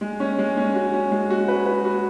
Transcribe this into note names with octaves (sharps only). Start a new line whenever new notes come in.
G#3
C#4
G#3
C#4
F#4
C#4
G#3
F#4
B4
B4
F#4